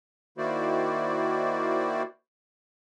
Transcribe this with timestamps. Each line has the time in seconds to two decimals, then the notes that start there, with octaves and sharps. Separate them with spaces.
0.38 D#3 A#3 E4 F#4 C5 D5